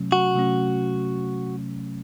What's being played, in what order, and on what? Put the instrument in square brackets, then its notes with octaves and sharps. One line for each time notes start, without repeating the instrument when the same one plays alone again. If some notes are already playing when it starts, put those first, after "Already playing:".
Already playing: [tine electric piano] C3 F#3 A3 C#4
[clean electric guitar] F#4
[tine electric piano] C3 F#3 A3 C#4